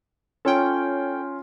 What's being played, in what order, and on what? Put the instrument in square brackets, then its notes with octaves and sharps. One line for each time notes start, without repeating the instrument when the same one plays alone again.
[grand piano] C#4 F4 [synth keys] A4 C#5 G5